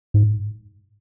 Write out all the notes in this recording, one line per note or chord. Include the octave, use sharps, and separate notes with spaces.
G#2